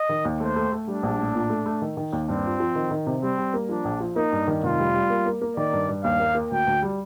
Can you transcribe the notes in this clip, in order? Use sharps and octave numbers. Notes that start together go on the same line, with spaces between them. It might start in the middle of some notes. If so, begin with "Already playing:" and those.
Already playing: D#5
D#3
D#2
A3 C5
A3
A3
G3 D4
A#1
A2
A#2
A3
A3
D#3
D#3
D#2
G2 C4
F4
F3
D#3
D#3
C3
G3 C4
G3
A#3
F3 D4
A#1
F3
A#3 D#4
G2
D#3
F1 F4
G3
G3
A#3
A#3
A#3
D#3 D5
G2
G2
D#2 F5
A#3
A#3
D2 G5
D2
G3